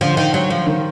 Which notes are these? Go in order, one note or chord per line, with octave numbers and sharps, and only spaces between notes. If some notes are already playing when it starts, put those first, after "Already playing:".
D3 F3
D#3
F#3
F3
D#3